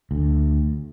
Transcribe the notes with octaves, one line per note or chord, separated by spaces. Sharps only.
D2